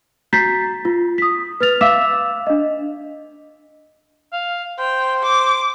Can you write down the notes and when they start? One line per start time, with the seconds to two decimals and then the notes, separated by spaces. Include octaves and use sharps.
0.33 F#4 A#5 G6 A6 B6 C7
0.85 F4
1.18 D#6 B6
1.60 B4 F6 A6 F7
1.81 E5 F5 D6 E6 B6 E7
2.47 D4 D#5
4.33 F5
4.79 C5 G5
5.23 D6